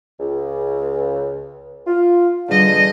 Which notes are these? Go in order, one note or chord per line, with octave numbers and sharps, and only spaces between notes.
C#2
F4
E2 D3 G3 D#5